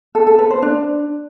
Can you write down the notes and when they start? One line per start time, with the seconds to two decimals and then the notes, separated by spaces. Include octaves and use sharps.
0.15 A4
0.27 A4
0.39 B4
0.50 C5
0.62 D4